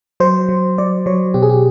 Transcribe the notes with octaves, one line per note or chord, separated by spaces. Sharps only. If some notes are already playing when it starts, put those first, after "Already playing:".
F#3 C5
F#3
F#3 D5
F#3 C#5
B2 G4
G#4
G4